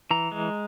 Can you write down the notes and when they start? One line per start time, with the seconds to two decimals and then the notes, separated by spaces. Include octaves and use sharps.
0.11 E3 A#5
0.32 G#3